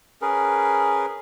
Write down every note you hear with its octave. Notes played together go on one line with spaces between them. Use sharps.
C#4 G#4 A#4 B4